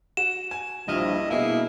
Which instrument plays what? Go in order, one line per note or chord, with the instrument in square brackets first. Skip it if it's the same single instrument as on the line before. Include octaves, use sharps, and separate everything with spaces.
[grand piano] F#4 [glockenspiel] E7
[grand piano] G#5
[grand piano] A#1 E4 F6 [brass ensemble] G2 F3 [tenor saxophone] D#5
[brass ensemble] B2 [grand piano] A#3 G#4 [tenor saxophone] E4